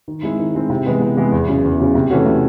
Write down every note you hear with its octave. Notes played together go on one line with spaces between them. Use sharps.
D#3
G#3 C4 E4
D#3
G#3 C4 E4
C3
E3 G#3 B3
C3
E3 G#3 B3
E2
C#3 F#3
E2
C#3 F#3
C3
E3 A3 C#4 F#4
C3